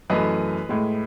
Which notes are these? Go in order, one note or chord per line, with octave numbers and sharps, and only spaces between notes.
F#2 E3 A3 B4 D#5
A2 G#3